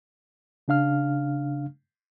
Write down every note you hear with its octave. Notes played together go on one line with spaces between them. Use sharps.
C#3 D4 F5 F6